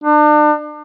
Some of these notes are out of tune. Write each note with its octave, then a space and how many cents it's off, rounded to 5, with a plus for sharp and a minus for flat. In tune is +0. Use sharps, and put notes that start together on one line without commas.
D4 +35